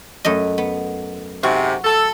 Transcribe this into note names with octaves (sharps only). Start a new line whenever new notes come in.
F#2 A3 D#5
B3
G#2 C3 F#4
A4